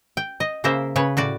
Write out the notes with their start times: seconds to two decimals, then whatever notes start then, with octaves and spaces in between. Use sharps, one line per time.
0.17 G5
0.40 D#5
0.64 C#3 A#3 A#4 C5 E5
0.96 C#3 B4 C#5
1.17 A2 F#4 D5